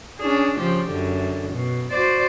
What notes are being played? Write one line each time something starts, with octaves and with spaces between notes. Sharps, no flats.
C#4 D4 G#4
C#3 F3 G4
F#2 D3
B2
F#4 C5 D5